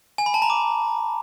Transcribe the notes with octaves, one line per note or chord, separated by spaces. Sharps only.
G#5
B5
A5
A#5
D6